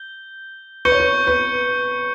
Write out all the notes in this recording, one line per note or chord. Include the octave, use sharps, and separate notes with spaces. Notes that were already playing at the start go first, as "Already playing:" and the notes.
Already playing: G6 G7
B4 C#6 G6 C#7 G7
C#5
B4
B4